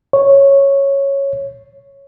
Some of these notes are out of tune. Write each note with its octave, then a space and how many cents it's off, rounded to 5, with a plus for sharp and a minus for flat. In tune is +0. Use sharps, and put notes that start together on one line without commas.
C#5 -5